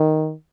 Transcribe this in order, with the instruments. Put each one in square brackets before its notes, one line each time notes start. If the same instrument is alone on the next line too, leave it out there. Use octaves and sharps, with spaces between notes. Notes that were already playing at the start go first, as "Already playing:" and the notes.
Already playing: [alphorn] D#3